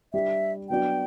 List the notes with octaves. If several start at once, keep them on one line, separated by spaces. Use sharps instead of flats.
G3 D4 G4 E5
F#3 B3 D4 F#4 G5